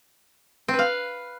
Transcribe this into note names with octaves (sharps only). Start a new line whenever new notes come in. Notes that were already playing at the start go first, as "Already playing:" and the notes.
C4
B4
F5